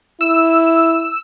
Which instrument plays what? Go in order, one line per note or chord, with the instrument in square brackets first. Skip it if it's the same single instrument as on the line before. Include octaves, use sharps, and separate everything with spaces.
[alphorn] E4 [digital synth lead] E6